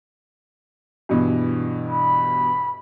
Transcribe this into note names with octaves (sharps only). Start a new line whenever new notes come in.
G2 B2 E3
B5